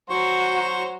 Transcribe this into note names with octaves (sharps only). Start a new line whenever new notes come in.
F#3 F#4 C5 A#5 C#6